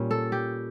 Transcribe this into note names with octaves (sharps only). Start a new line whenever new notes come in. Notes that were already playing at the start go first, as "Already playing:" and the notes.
Already playing: A#2 G3 C#4
A4
G4